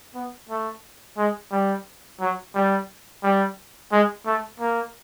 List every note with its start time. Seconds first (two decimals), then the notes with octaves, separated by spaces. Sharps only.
0.14 B3
0.49 A3
1.18 G#3
1.51 G3
2.20 F#3
2.55 G3
3.23 G3
3.92 G#3
4.26 A3
4.60 A#3